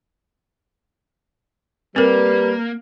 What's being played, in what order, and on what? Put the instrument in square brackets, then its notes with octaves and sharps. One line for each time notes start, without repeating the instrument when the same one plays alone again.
[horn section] G3 [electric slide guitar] A#3 [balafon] C4 A#4 [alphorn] B4